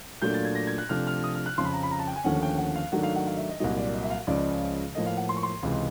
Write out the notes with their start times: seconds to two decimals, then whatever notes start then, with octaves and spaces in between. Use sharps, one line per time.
0.22 A#2 F#3 A3 D4 F4 G6
0.34 A6
0.45 G#6
0.55 A#6
0.67 G#6
0.78 F#6
0.89 C3 F3 A3 D4 F4 F6
1.07 F6
1.24 D#6
1.35 F6
1.46 F#6
1.58 F2 C#3 F3 C6
1.65 B5
1.74 A#5
1.83 B5
1.91 A#5
1.99 A5
2.08 G5
2.16 G#5
2.24 D#2 D3 F3 A3 C#4 F#5
2.42 G5
2.58 F#5
2.76 F5
2.92 G#2 D#3 F#3 A3 D4 F#5
3.03 F5
3.16 F#5
3.27 F5
3.37 E5
3.49 D#5
3.60 C2 A#2 F#3 D#5
3.77 D5
3.93 D#5
4.03 E5
4.10 F5
4.27 C#2 C#3 F3 G#3 D5
4.95 A2 F3 A#3 D#5
5.06 F5
5.17 F#5
5.29 C6
5.37 C#6
5.43 C6
5.63 C#2 C3 E3 G#3